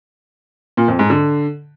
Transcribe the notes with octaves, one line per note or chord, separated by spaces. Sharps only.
A#2
F2
G#2
D3